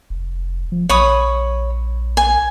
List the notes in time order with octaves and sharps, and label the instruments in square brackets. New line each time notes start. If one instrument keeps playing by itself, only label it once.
[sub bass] F1
F3
[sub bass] A#1 [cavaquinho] C#5 B5 D#6
[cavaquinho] G#5